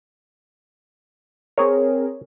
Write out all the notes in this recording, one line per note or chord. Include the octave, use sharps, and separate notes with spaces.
C4 G#4 A#4 C#5